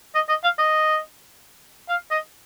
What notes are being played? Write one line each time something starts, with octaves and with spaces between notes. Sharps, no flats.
D#5
D#5
F5
D#5
F5
D#5